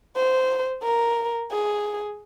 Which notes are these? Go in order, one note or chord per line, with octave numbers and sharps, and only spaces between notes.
C5
A#4
G#4